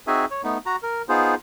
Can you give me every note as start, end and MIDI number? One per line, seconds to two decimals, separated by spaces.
0.07 0.25 60
0.07 0.25 63
0.07 0.25 66
0.07 0.25 68
0.07 0.25 76
0.07 0.25 80
0.31 0.42 73
0.44 0.58 57
0.44 0.58 59
0.44 0.58 63
0.66 0.76 66
0.66 0.76 82
0.83 1.02 70
1.09 1.35 59
1.09 1.35 63
1.09 1.35 65
1.09 1.35 68
1.09 1.35 72